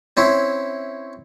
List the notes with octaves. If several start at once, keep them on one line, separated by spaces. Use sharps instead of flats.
C4 C#4 E4